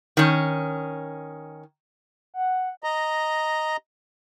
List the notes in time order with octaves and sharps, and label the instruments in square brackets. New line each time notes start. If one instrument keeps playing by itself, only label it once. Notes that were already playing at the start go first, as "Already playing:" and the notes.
[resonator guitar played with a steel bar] D#3 C#4
[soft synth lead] F#5
[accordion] D#5 A#5